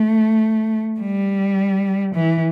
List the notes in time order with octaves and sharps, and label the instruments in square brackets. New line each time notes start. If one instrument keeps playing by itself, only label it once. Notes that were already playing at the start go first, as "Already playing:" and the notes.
Already playing: [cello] A3
G3
E3